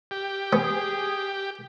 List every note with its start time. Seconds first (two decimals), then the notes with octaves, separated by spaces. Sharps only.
0.11 G4
0.53 B3 G#4